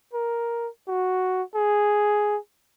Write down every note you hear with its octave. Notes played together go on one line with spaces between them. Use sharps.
A#4
F#4
G#4